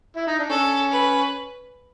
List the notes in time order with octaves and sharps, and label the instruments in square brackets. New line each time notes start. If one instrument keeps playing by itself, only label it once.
[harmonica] E4
D#4
D4
[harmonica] C#4 [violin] A4
[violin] B4